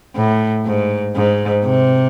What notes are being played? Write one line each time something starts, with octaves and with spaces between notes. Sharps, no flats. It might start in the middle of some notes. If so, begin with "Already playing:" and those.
A2
G#2
G#2
C3